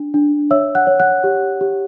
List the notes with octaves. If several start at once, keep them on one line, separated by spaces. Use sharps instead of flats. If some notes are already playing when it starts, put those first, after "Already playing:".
Already playing: D4
D4
C#5 E5 E6
F#5 F#6
C#5
F#5 F#6
G4
G4